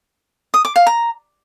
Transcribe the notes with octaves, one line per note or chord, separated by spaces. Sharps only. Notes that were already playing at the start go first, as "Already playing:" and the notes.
D#6
D6
F5
A#5